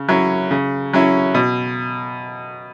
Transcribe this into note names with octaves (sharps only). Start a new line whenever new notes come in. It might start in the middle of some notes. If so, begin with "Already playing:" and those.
Already playing: C#3
F#3 C#4 E4
C#3
F#3 C#4 E4
B2